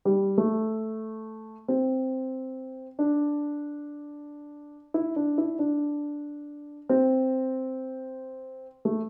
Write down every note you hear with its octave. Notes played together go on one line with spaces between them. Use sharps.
G3
A3
C4
D4
E4
D4
E4
D4
C4
A3